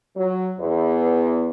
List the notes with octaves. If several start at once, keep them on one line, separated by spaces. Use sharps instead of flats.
F#3
E2